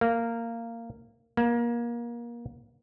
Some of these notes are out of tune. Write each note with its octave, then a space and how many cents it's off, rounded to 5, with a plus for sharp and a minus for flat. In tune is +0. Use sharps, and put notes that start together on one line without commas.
A#3 -15
A#3 +25